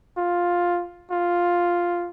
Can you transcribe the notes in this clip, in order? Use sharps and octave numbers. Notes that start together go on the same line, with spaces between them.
F4
F4